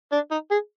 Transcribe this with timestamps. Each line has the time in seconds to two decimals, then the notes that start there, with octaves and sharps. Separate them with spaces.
0.12 D4
0.31 D#4
0.51 G#4